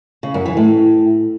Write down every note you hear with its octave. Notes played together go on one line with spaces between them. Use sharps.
C#3
F#2
E3
A2